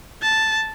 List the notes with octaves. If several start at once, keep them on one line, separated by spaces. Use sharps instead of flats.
A5